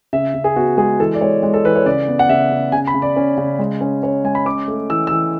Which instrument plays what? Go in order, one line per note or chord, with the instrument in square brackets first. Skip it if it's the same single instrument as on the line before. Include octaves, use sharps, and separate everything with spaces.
[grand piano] C#3 E5
C#3
G#4
B3 F#4
G#3 G#4
E3 A4
D5
G#3 C#5
G#3
A4
E3 B4
C#5
C#3 D5
B3
F#5
C#3 E5
C#3
C#3 G#5
B5
C#3
D5
C#4
C#3
G#3
C#4
C#4 C#5
G#3 G#5
B5
C#4 D6
A3
E3 E6
E3 E6